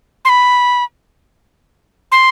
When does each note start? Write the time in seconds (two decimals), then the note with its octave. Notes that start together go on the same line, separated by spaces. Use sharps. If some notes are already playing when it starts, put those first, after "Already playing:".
0.25 C6
0.29 B5
2.12 C6